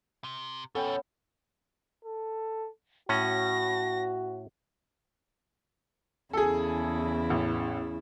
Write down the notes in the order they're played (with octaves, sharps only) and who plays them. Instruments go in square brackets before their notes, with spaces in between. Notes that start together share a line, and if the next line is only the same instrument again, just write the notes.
[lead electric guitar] C3
[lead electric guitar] F2 B2 [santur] B3 C#4 [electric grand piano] A4 G5
[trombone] A4
[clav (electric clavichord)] A2 C#4 [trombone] F#4 [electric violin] A#6
[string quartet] E2 C#3 E4 [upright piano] G#4 A4
[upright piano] A1